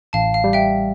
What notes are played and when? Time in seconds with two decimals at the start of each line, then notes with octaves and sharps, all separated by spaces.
0.13 A1 F5 A5
0.34 F5
0.44 G3
0.53 E5 G5